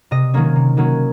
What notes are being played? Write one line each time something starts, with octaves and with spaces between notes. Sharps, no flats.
C3 D#5
D#3 F#3 A#3 C#4
C3
D#3 F#3 A#3 C#4